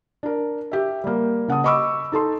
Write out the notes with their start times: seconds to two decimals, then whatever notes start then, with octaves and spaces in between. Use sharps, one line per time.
0.23 D4 A#4
0.71 G4 E5
1.04 G3 A#3
1.48 C#3 F#5 A5 D#6
1.64 D#5 B5 C#6 D6 E6
2.12 D#4 A4 A5 C6